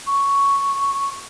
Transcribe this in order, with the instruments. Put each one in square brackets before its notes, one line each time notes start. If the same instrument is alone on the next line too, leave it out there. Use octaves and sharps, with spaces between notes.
[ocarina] C#6